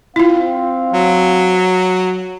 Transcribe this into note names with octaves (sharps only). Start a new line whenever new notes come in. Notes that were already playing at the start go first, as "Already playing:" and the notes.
C4 E4 F4 F5
F#3